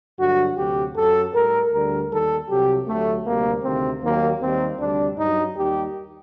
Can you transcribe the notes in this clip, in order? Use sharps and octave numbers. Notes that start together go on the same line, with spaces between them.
G2 D3 F#3 F#4
D2 C3 F#3 G4
F#2 F#3 A4
A2 G3 A#4
D2 D3 G3 A#4
D#2 D#3 G3 A4
C2 C3 F#3 G4
D2 D3 F#3 A3
D2 C3 G3 A#3
D2 C3 D#3 C4
D#2 D#3 F#3 A#3
D#2 D#3 G3 C4
D2 C3 G3 D4
G2 F#3 D#4
D#2 D#3 G3 G4